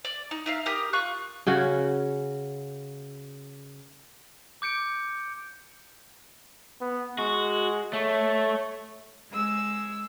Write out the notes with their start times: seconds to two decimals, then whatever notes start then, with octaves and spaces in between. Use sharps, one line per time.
0.05 D5
0.31 D#4
0.46 D#4 E5 F5
0.66 G4 A#4 D#6 F6
0.93 F4 C#6 F#6
1.47 C#3 C#4 F#4 F#5
4.62 D6 G6 C#7 D7
6.81 B3
7.18 G#3 F#4
7.93 A3 C#5
9.31 G#3 E6